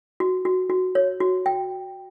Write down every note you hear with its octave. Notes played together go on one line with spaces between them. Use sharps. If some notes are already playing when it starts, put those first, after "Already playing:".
F#4
F#4
F#4
C#5
F#4
G5